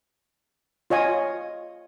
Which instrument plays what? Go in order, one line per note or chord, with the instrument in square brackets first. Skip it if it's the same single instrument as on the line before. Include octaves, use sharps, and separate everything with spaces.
[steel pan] F4 C#5 D#5 G#5